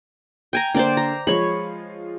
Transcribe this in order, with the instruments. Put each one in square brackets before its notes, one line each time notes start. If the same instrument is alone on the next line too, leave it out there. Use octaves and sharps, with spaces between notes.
[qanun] G5 G#5 A#5
[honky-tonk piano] D3 A#3 [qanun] C5 D5 G5
[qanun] A#5
[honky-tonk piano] F3 G#3 F4 [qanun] C#5 B5